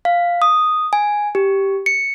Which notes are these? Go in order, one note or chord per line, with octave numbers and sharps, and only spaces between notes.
F5
D#6
G#5
G4
C#7